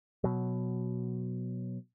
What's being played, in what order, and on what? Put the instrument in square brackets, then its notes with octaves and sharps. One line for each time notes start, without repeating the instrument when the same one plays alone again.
[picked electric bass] B2 F#3